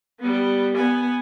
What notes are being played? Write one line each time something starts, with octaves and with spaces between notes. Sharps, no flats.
G3 B3
B3 G#5